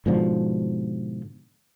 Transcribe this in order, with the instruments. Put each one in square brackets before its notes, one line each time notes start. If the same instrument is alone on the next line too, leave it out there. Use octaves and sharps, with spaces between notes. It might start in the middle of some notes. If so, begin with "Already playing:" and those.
[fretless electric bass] G#2 B2 D3 F3